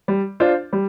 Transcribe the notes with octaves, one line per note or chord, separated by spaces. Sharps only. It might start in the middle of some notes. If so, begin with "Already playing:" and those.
G3
D4 F4 C5
G3